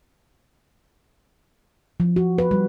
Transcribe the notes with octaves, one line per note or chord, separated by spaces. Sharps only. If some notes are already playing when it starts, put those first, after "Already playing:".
F3
F#4
B4
G3